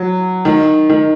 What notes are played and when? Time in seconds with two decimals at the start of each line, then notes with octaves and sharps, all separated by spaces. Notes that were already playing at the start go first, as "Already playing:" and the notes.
Already playing: F#3
0.45 D#3
0.90 D#3